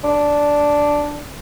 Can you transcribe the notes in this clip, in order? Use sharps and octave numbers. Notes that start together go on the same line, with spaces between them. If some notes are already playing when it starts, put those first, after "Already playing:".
D4